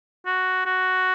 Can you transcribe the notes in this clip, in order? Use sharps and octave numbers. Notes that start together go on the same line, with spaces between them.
F#4
F#4